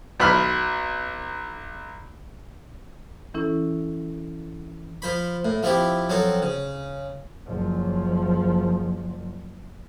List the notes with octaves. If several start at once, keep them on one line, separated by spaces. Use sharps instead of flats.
B1 B5 F6
E3 C#4 E4 A4
F3 C5 B5
A2
F3 C4 E4 G4
F3 F#3 C4 A4
C#3
F#1 F3